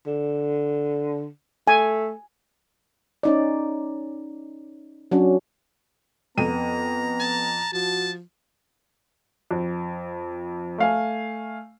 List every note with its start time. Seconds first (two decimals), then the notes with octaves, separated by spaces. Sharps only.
0.06 D3
1.67 A3 G#5
3.23 C#4 D#4 D5
5.11 F#3 C#4 D4 F#4
6.38 F2 B3 A#5 D#7
7.20 A5
7.73 F3 F#4 A5
9.51 F2
10.78 A3 F5 G#5